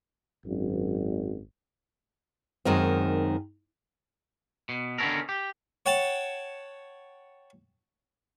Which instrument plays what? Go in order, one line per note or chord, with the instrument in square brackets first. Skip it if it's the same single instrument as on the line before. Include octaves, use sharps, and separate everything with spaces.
[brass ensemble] G#1 F#2
[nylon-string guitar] F#2 D#3 G#3 C4
[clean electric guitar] B2
D3 D#3 B3 C#4 A4 A#4
G4
[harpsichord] C#5 F#5 G5 A5